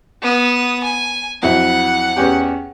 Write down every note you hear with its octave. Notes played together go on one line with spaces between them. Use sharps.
B3 D#6
G#5
F2 F#3 E4 F#5
E2 C#4 G4